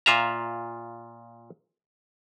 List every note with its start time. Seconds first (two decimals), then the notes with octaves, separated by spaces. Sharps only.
0.06 A#2 F4 E5 A#5